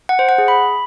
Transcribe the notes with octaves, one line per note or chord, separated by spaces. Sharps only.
F#5
C5
F#5
G#4
B5